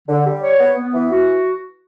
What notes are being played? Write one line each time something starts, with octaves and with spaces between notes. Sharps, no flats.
D3
G3
C#5
B3
B3
E3
F#4